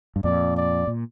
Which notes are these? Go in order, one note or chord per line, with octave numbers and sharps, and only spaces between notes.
G2
F2 A#2 D5
D5
A#2